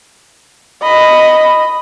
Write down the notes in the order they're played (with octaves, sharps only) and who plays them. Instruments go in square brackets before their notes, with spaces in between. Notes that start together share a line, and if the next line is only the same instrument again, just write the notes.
[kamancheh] D#5 B5